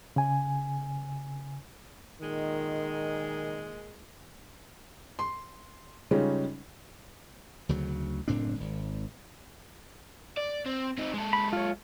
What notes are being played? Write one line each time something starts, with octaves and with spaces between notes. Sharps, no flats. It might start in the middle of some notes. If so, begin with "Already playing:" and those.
C#3 G#5
A#2 D#3 G#3
C6
C#3 G3 G#3 C#4 D#4 F4
D2 C#3 F#3
F#1 A2 C4 D4
G#1
D5
C4
C4 D#4
G#3 A4
B5
F4 C#5